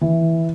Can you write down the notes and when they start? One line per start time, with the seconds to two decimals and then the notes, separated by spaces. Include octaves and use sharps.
0.01 E3